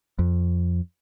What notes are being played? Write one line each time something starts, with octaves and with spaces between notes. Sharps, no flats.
F2